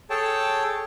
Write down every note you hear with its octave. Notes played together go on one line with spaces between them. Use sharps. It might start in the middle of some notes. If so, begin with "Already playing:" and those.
G#4 A4 C#5 G5 A5